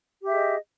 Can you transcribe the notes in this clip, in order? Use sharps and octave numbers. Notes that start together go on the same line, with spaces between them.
G4 G#4 D#5 E5